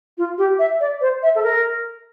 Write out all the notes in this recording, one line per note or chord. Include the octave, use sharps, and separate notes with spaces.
F4
G4
E5
D5
C5
E5
A4
A#4